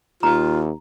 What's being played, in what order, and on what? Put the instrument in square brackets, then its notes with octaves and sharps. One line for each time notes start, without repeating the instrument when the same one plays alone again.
[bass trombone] D#2 [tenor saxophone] F4 [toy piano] A#5